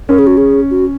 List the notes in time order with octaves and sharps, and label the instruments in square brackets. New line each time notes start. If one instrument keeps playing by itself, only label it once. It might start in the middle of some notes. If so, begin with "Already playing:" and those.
[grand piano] C#4 [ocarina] A#4
[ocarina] G#4
F#4
G#4
F#4